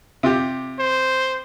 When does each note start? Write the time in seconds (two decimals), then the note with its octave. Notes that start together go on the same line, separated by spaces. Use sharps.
0.23 C3 F4 G4
0.79 C5